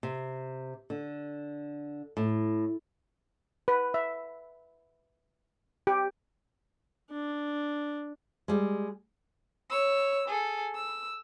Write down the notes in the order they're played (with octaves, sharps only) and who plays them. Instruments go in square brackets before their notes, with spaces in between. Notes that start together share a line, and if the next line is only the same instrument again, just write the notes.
[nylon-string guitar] C3
D3
A2
[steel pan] B4
E5
G4
[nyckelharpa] D4
[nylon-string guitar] G3 G#3
[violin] C#5 E6
G#4 A4
E6